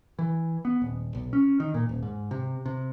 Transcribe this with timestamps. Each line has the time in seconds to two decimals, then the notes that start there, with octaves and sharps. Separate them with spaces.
0.19 E3
0.65 B3
0.82 D#1
1.15 B1
1.33 C#4
1.60 D#3
1.74 A#2
1.89 D#1
2.03 G#2
2.31 C3
2.66 C3